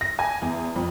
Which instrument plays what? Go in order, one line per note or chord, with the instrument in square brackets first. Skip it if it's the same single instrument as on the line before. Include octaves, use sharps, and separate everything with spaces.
[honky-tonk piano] A#6
G#5
E2
F2